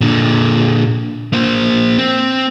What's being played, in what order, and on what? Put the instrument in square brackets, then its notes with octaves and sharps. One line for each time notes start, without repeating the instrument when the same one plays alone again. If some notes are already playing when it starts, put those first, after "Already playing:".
[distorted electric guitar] A#2 D3
A#3 C5
C4